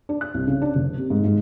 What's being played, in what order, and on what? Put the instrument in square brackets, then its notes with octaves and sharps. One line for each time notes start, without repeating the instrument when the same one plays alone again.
[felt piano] D4
F#6
C2
C#3
D4
F#1
C3
G#2
G#2